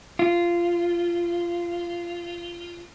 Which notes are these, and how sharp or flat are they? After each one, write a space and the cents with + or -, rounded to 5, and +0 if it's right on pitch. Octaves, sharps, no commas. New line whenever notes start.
F4 -15